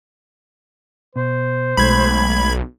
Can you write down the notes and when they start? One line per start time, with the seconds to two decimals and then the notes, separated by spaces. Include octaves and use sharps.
1.16 B2 C5
1.77 B1 G#3 A3 B5 G#6